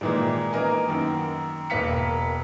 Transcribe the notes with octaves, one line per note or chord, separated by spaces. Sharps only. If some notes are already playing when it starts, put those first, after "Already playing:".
A#2 D#3 E3 G#3 A#3
A#3 B3 D#4 A#4 G#5
F#2 D#3 A#3
E1 A#3 B4 F5 B6 C#7